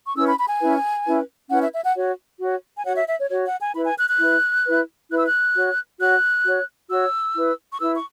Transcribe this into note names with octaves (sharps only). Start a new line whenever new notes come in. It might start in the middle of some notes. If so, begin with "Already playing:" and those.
C#6
C#4 E4 B4 E6
B5
B5
G#5
C#4 E4 B4
C#4 E4 B4
C#4 E4 B4 F#5
E5
E5
F#5
F#4 C#5
F#4 C#5
G#5
F#4 C#5 F#5
E5
E5
C#5
F#4 C#5
F#5
G#5
E4 B4 B5
G#5
F#6
F#6
E4 B4
E4 B4
E4 B4 F#6
E6
F#6
F#4 C#5
F#4 C#5 F#6
F#4 C#5
F#4 C#5 E6
E4 B4
C#6
E4 B4 E6
C#6